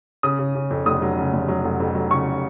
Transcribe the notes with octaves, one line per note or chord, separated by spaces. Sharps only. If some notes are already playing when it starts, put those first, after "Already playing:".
C#3 D#6
C#3
C#3
F2
F1 D#6
F#3
C#3
F1
F#3
F1
F2
F#3
C#3 C#6